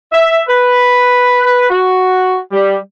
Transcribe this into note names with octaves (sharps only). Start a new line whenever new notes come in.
E5
B4
F#4
G3